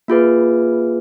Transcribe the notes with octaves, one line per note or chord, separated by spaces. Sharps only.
A#3 F4 G#4 B4